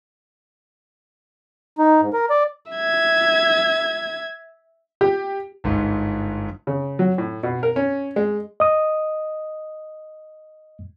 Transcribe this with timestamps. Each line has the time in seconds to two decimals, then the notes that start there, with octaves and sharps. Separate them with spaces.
1.78 D#4
2.01 G#2
2.13 A#4
2.30 D5
2.72 E5 G#6
5.01 G4
5.64 G1 G#2
6.67 C#3
6.99 F#3
7.18 A2
7.43 B2
7.63 A#4
7.76 C#4
8.16 G#3
8.60 D#5 D#6